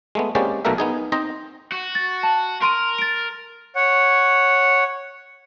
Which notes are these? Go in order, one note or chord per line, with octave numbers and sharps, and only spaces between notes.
G#3 A3 B3
G#3 A#3 C4 C#4 G4 D5
B1 B2 A3 A#3 A#4 E5
B3 D#4 G#4
C4 D#4 C5 D#5 A#5
F#4
A6
A5
A#4 C6 D7 D#7
A6 D7
C#5 F#5